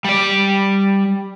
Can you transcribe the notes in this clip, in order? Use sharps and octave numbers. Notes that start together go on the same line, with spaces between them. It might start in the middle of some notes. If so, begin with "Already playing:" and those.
G3 D5